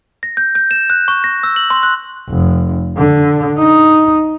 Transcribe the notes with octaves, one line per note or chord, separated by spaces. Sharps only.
A#6
G6
G6
E7
F#6
C#6
A#6
E6
F#7
C6
F#6
F1
D3
D#4